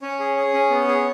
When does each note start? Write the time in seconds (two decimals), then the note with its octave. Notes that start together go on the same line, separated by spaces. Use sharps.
0.02 C#4 C#5
0.19 G#4
0.37 G#4
0.54 C#4
0.70 B3
0.88 G#4